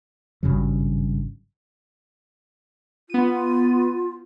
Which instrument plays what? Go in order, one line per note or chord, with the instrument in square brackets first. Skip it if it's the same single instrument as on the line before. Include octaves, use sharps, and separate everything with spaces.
[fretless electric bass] G#1 G2 C#3 F#3
[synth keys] B3 D#7 [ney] F4